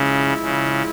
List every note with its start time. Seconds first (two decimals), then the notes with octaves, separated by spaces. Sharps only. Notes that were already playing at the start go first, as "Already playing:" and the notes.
Already playing: C#3 F3 G#3 E4
0.42 C#3